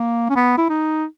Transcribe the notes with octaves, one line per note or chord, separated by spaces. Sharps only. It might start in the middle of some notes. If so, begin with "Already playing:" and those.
Already playing: A#3
C#4
B3
E4
D#4